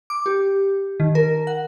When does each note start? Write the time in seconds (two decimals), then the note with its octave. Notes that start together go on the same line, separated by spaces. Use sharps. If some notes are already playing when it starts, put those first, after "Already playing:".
0.10 D6
0.26 G4
1.00 D#3
1.15 A#4
1.47 F#5